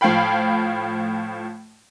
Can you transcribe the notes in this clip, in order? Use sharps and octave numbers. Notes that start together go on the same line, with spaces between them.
A2 F3 F5 G5 B5